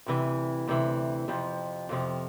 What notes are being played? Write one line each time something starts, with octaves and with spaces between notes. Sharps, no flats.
D2 C3 E3
D2 C3 E3
F2 C3 F3
F2 C3 F3